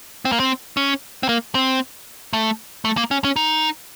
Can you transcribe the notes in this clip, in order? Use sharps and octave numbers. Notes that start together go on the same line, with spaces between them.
C4
A#3
C4
C#4
C4
A#3
C4
A3
A3
A#3
C#4
C#4
D#4